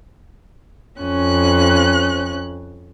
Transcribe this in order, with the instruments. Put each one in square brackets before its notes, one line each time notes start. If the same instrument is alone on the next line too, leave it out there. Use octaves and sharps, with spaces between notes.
[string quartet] F2 C#4 F#6